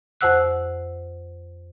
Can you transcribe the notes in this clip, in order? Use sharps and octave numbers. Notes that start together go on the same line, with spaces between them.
F2 C5 F#5 E6 F#6